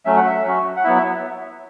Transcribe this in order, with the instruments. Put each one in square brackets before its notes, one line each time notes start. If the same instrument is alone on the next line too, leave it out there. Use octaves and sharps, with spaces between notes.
[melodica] F#3 A3 C#4 E5
F#5
E5
F#3 C#4 F#4
F#5
F#3 B3 E4 E5
E5